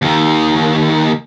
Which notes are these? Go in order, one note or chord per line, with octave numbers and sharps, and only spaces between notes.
D#2 D#3